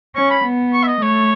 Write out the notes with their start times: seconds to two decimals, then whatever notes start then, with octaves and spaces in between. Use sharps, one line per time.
0.15 C#4 C#6
0.30 B5
0.44 B3
0.73 C#6
0.83 E5
0.87 D#5
1.01 A3 C#5